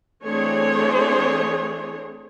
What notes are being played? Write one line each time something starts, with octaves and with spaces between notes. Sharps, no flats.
E3 A3 C4 D4 G#4 C#5